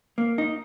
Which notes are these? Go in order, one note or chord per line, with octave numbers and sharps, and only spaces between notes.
A#3
D#4